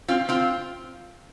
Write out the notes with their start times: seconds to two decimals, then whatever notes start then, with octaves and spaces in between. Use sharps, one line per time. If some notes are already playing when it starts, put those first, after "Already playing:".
0.08 C4 F4
0.29 C4 F4